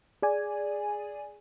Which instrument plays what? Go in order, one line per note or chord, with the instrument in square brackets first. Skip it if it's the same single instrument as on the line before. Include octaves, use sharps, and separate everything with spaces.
[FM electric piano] G#4 D5 G#5